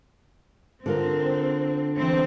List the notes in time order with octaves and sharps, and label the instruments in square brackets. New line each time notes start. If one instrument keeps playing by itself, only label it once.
[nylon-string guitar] D3 F4 A#4 [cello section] C4
[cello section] E3 C4